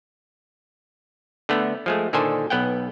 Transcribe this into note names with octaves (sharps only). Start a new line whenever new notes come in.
D3 A3 B3
F3 G#3 A3
A#2 D3 D#3 A4 C5 G#5
B1 B3 F#5 G5